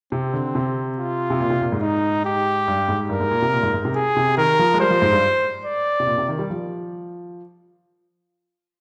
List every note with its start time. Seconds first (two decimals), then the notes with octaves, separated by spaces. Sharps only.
0.12 C3 C4
0.34 D3
0.55 C3
0.98 F4
1.30 C3
1.40 A#2
1.50 C3
1.61 A#2
1.72 G#2
1.82 D#4
2.25 G4
2.68 G2
2.89 G#2
3.09 G2 A#4
3.20 G#2
3.31 A#2
3.42 C3
3.53 A#2
3.63 G#2
3.74 G#2
3.85 C3
3.95 G#4
4.17 C3
4.38 D#3 A#4
4.59 F3
4.74 G#3
4.80 G3 C5
4.91 F3
5.02 G#2
5.12 G2
5.65 D5
6.00 C3
6.07 A#2
6.18 C3
6.28 D#3
6.39 G3
6.50 F3